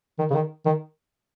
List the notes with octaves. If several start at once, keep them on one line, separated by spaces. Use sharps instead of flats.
D#3
C#3
D#3
D#3